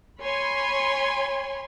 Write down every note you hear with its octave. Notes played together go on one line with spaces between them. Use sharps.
C#5 G#5 B5 C6